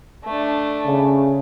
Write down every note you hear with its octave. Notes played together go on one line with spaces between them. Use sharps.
A3 D4
C#3